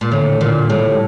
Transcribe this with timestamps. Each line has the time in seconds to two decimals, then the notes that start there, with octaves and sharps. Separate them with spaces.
0.01 A#2
0.12 A2 D3
0.40 A#2 D3
0.69 A2 G3